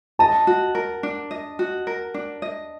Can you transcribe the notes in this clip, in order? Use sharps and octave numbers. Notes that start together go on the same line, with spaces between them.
D#5 A5
F#4
A#4
D4
D#5
F#4
A#4
D4
D#5